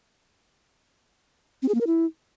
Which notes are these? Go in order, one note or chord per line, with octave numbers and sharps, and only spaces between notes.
C4
G#4
A#3
A#4
E4